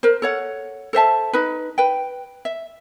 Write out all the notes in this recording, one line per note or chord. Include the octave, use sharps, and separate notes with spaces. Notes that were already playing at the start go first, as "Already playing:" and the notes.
A#4 C5
A4 C#5 F#5
A4 C5 E5 A5
D#4 B4
B4 G5
E5